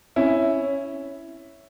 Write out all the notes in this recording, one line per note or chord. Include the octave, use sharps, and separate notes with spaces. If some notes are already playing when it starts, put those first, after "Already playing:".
C#4 E4